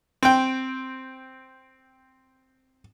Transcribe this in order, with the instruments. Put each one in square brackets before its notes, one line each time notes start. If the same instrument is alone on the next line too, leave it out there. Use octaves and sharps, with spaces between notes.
[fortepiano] C4 G5